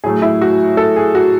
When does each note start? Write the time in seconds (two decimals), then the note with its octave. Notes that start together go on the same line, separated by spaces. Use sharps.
0.04 A2 F#3 A3 G#4
0.22 E4
0.42 F#4
0.77 A4
0.96 G#4
1.15 F#4